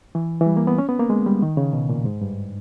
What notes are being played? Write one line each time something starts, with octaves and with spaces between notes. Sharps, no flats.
E3
E3
G3
A#3
B3
C#4
B3
A#3
G#3
G3
D#3
C#3
B2
A#2
G#2
G2